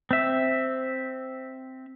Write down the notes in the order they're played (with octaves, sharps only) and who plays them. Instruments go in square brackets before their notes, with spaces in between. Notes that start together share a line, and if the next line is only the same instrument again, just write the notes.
[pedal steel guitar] C4 E5